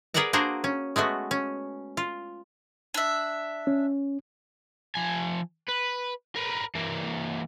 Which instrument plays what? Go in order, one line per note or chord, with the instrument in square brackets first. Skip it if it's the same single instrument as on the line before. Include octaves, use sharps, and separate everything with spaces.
[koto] G#4 A#4 B4 D5 F#5 A#5
A#3 D4 F#4 G#4 A#4 C5
C#4
G#3 A3 B3 F#4
C#4
F4
[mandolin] D4 E5
[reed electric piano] C#4
[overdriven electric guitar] F3 G#5
B4
A#4 B4
E3 A#3